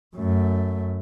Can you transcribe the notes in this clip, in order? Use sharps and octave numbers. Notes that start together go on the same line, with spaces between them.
F#2 A3